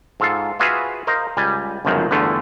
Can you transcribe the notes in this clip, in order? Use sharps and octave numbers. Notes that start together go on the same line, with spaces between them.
G#2 F4 A4 F5
F4 F#4 G#4 B4 E5 F5
A#4 C5 D#5 F5
C#2 G3 G#5
G1 C#2 F#2 D#3 F3 F#3
E2 G2 D3 A3 F4